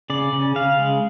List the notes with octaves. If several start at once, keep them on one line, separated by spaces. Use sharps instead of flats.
C#3 D5
C#3
C#3 F5
G#3